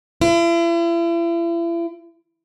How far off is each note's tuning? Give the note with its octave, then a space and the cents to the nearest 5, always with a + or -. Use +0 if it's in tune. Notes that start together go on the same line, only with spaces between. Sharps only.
E4 +40